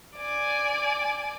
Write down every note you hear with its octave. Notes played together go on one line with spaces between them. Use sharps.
D5 G#5